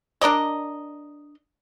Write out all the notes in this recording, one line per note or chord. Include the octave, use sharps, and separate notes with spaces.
D4 A#4 D5 D#5